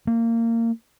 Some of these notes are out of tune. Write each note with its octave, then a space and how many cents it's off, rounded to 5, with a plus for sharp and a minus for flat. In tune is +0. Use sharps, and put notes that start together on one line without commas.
A#3 -25